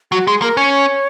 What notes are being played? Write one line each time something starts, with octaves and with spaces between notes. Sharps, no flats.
F#3 F#4
G#3 G#4
A#3 A#4
C#4 C#5